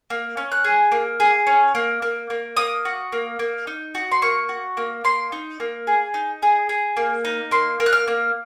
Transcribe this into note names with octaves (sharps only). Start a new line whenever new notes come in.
A#3
C#4
F#6
G#4
A#3
G#4
C#4
A#3
A#3
A#3
A#3 D#6
F#4
A#3
A#3
D#4
F#4
C6
A#3 C#6
F#4
A#3
A#3 C6
D#4
A#3
G#4
D#4
G#4
G#4
A#3
D#4
A#3 C6
A#3
F#6
F6
A#3